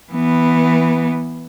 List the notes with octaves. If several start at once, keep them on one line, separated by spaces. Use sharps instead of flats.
E3 B3